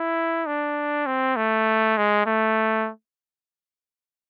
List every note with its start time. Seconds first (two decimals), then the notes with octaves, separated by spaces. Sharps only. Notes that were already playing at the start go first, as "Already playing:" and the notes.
Already playing: E4
0.46 D4
1.06 C4
1.36 A3
1.97 G#3
2.26 A3